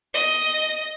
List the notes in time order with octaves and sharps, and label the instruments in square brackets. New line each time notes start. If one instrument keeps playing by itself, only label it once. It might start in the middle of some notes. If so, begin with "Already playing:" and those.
[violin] D#5